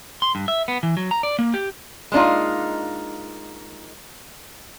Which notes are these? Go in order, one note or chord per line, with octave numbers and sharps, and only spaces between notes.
C6
G2
E5
B3
E3
F#3
A#5
D5
A#3
G4
G#3 A#3 D4 D#4 F4